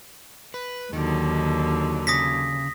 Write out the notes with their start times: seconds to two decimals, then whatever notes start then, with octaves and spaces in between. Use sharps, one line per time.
0.54 B4
0.93 D#2 D3 D#3 F#3
2.07 C#3 D#6 A#6 B6